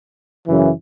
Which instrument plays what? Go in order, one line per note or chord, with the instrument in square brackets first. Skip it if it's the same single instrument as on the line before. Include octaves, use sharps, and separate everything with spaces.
[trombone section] F#2 C#3 E3